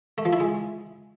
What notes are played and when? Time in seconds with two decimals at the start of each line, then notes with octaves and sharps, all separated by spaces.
0.18 A3
0.25 F3
0.33 E4
0.40 G#3